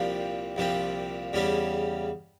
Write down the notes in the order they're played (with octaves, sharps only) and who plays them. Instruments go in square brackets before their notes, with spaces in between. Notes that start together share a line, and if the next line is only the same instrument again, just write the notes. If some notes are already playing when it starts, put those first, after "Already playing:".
Already playing: [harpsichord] C2 A#2 F3 C4 G4
C2 A#2 F3 C4 G4
E2 C#3 G3 C#4 G4